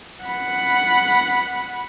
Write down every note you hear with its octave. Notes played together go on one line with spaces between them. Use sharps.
F#5 B5